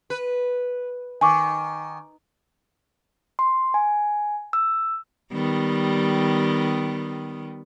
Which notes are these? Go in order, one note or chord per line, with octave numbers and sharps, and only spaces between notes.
B4
D#3 G#5 C#6 D6
C6
G#5
E6
D#3 G3 B3